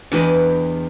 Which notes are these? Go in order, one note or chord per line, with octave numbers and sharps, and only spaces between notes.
E2 D4 G4 B4 D#5